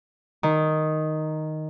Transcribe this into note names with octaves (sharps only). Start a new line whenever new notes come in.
D#3